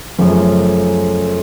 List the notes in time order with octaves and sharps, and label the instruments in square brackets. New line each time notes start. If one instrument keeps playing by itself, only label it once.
[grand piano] F#2 C#3 F3 A3 C#4